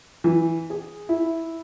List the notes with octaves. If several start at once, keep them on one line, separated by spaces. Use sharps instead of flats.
E3
G#4
E4